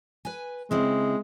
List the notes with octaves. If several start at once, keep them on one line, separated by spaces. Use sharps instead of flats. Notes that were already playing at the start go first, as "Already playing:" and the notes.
B4 G#5
C#3 G#3 C4 E4